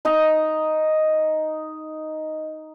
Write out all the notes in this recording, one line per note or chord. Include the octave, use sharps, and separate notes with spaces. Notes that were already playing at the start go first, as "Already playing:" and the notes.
D#4 D#5 A#5